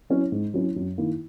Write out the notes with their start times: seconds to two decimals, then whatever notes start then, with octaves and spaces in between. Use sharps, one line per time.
0.10 F#3 C#4 E4
0.32 G#2
0.54 F#3 C#4 E4
0.76 F#2
0.98 D#3 A#3 E4